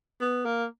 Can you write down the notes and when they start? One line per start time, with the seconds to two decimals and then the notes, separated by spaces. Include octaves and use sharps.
0.21 B3
0.45 A#3